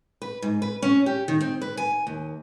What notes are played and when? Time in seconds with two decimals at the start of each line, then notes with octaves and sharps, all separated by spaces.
0.22 B4
0.42 G#2
0.62 B4
0.82 C#4
1.06 G4
1.28 D#3
1.41 C4
1.62 B4
1.77 G#5
2.07 D#2